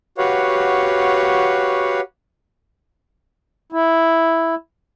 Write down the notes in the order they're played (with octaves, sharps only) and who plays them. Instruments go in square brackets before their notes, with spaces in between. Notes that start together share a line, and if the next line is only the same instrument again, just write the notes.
[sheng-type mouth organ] F#4 G4 B4 C#5 F5 F#5
[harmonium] E4